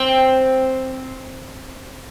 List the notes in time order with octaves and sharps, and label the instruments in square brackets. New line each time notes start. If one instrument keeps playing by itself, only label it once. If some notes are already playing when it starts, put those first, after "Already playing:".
Already playing: [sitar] C4